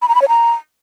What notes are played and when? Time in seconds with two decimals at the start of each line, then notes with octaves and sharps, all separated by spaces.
0.02 B5
0.08 A#5
0.15 B5
0.22 C#5
0.28 A#5